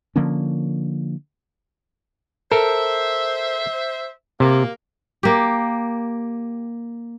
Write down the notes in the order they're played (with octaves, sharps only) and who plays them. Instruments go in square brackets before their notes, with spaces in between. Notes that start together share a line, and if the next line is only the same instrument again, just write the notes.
[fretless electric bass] D3 F3 A#3 C#4
[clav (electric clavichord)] A4 A#4 [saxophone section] C5 E5
[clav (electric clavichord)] C3 [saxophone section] A#3
[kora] A#3 G4